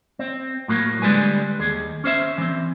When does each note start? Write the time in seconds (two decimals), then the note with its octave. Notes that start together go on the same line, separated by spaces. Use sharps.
0.19 C4
0.68 A2 F#3 A#3
1.02 D3 G3 G#3 B4 G#5
1.60 D#2 G#4
2.04 C#4 C5 E5
2.38 E3 C4